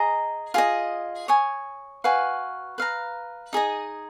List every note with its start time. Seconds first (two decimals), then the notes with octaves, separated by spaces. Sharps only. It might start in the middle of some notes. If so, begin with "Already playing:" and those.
Already playing: G#4 D#5 A#5
0.54 F4 G#4 D#5
1.28 C#5 G#5 D#6
2.04 F#4 B4 F5 G#5
2.78 B4 F5 A#5
3.53 D#4 G#4 D#5